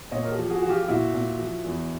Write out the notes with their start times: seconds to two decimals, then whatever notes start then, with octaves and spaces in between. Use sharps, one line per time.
0.11 A#2 C#5 D#5
0.24 A#4
0.31 G4 A4
0.38 F3
0.50 F#4 G#4
0.62 F3 F#4
0.69 F4 G4
0.83 G4
0.89 A#2 E4 F#4
1.14 A#2
1.39 F3
1.64 E2